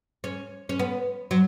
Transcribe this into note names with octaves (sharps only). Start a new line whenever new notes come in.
C#4
C#4
B3
F#3